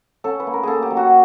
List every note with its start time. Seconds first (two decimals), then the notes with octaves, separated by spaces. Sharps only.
0.24 C#4 A4
0.40 B4
0.47 A#3
0.53 A#4
0.63 A#3 G#4 A4
0.83 G4
0.91 F#3
0.97 F#4